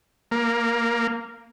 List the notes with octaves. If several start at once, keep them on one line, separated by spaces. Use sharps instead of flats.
A#3